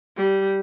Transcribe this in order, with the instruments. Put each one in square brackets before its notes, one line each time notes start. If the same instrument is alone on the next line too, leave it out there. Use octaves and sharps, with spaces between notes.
[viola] G3